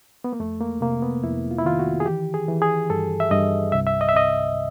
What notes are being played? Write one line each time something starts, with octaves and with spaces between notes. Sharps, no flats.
B3
A#3
F2 A3
A#3
C3 A#3
B3
F2 E4
F4
E4
D#3 F4
F#4
G#4
E3 G4
G#4
E3
G#4
G2 A4
E5
G2 D#5
C2 E5
E5
D#5
E5
C3 D#5